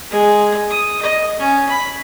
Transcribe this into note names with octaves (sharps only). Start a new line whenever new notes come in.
G#3
D#6
D#5
C#4
B5